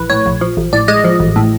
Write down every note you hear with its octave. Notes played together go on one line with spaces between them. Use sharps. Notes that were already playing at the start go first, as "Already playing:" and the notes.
Already playing: A#1 E3 B4
A2 C#5
A#1
F3
A1
A2 D5
G#3 D#5
F3
A1
A2